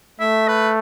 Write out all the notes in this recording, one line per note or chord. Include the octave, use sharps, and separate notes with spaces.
A3 E5
B4